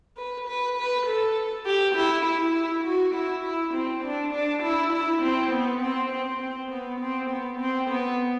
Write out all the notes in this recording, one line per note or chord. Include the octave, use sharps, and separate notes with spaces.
B4
B4
B4
A4
G4
E4
E4
E4
F#4
E4
E4
C4
D4
D4
E4
E4
C4
B3
C4
C4
C4
B3
C4
B3
C4
B3